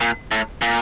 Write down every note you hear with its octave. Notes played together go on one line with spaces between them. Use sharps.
A#2
A2
A#2